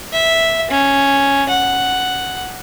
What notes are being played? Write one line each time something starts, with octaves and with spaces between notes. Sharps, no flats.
E5
C#4
F#5